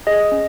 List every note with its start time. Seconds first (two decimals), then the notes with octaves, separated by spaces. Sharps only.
0.07 G#4 D#5
0.32 C#4